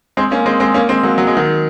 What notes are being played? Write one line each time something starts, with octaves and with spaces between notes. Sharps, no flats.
G#3 C4
A#3 C#4
G#3 C4
G#3 C4
A#3 C#4
G#3 C4
F#3 A#3
F#3
G#3
D#3 F#3